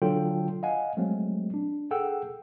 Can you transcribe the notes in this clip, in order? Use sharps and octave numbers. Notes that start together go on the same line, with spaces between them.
D3 F#3 F4 A4 G5
D#5 F5 F#5 G#5
F#3 G#3 A3 C4
D4
G#4 A4 F#5 G5 E6